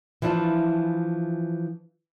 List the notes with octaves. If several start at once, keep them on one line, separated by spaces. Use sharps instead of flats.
E3 F3 D4 E4 F4